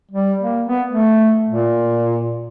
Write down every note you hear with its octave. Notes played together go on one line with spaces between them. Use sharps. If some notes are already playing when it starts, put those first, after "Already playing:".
G3
A#3
B3
A3
A#2